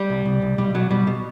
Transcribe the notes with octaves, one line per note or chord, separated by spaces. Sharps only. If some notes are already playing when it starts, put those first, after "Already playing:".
Already playing: G3
C2
C2
C2
B1 G3
B2 F#3
B2 G3
B2